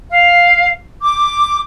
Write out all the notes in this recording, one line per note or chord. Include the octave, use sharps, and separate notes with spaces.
F5
D6